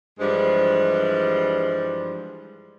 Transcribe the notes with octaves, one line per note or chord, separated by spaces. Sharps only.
G2 E3 F3 G3 G#3